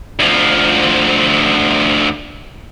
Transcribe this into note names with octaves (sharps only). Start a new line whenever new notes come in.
D2 F3